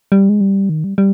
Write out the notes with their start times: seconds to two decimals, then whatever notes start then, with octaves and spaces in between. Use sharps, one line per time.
0.12 G3
0.29 G#3
0.41 G3
0.69 D#3
0.84 G3
0.98 G3